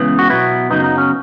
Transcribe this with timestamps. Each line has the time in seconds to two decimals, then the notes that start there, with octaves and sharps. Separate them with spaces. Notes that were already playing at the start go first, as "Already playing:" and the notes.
Already playing: C#2 C#3 E3 B3
0.19 F#4
0.29 B2 F#3 B3 E4
0.71 F#2 C#3 F#3 B3 D#4
0.84 D#4
0.98 C#4